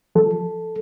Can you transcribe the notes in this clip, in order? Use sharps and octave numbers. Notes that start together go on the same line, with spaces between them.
F3 A4